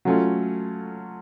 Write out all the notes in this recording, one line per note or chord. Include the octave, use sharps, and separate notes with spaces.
F#3 A3 C#4 F4